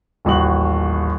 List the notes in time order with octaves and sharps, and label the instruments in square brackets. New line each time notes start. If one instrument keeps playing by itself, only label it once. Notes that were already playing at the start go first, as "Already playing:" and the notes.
[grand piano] D#1 A1 F#4 F#7